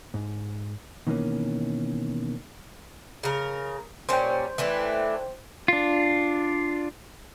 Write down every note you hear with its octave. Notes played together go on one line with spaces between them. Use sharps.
G#2
B2 D#3 E3 A#3 C#4
C#3 A#4
A#2 G3 C#4 C5 G5
E3 A3 D4
D4 F4